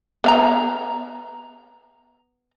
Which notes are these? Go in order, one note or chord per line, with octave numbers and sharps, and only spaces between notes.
B3 F5 A#5